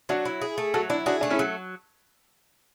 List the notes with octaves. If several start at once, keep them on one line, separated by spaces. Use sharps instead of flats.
F#3 D4 F#4
E4
G#4
A3
F#3 F#4 A4
D4 E4
D4 F#4 G#4
A3 D4
C#4 E4
F#3